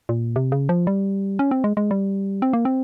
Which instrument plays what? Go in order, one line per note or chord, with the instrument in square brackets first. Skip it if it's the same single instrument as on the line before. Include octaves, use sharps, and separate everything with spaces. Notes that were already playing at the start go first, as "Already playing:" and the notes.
[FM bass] A#2
C3
C#3
F3
G3
C#4
C4
G#3
G#3
G3
C4
A#3
C4